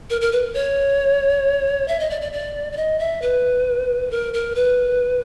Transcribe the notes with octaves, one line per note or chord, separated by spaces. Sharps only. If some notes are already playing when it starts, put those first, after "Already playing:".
A#4
A#4
B4
C#5
E5
D#5
D5
D5
D5
D5
D#5
E5
B4
A#4
A#4
B4